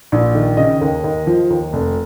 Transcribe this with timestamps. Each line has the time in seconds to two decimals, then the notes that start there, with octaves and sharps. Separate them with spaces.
0.12 A#1
0.35 D#3
0.57 C#3 D#5
0.81 D#2
1.04 D#2
1.27 F3
1.50 D#2
1.73 F1